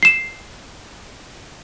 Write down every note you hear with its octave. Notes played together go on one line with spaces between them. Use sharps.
C7 E7